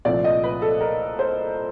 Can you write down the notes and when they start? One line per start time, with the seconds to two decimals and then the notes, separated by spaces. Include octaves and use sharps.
0.05 C2 A#2 F3 A3 C4 D5
0.24 D#5
0.44 B4
0.62 A4
0.81 A#4
1.19 C5